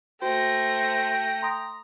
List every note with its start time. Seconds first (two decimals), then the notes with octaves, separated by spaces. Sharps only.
0.22 A3 F#4 C5 G5 A#6
1.42 A#5 C6 D#6 A#6